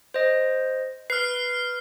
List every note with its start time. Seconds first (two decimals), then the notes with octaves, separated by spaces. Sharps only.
0.14 C5 D#5
1.10 B4 F6 C7